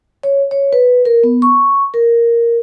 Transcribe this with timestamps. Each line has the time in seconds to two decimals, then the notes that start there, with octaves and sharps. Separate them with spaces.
0.23 C#5
0.51 C#5
0.73 B4
1.05 A#4
1.23 B3
1.42 C#6
1.94 A#4